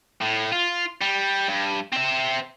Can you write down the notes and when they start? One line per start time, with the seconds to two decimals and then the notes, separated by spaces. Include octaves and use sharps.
0.22 A2
0.52 F4
1.01 G3
1.48 G2
1.93 C4 E5